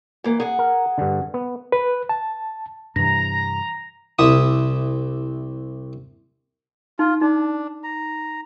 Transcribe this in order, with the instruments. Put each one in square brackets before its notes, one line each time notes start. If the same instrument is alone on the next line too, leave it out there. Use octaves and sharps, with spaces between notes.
[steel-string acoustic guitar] E3 A#3
G#4 F#5
[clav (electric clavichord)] A#4
G2 D3
B3
[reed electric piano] B4
A5
[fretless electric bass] G2 C3 E3 [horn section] A#5 [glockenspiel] A#6
[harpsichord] C2 E4 E5 D#6
[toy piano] D#4 [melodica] F4
[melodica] D4 [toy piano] D#4
[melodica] A#5